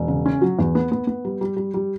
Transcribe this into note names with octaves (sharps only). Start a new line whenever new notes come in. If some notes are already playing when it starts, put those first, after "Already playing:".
Already playing: E1
C#3
C#4
F#3
E2
B3
B3
B3
G3
G3
G3
G3